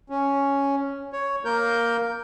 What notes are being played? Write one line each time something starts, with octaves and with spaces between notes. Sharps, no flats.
C#4
C#5
A#3 A#4 G6